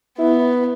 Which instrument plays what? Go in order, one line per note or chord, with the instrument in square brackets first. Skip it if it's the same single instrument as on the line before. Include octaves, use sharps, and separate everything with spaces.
[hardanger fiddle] B3 [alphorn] E4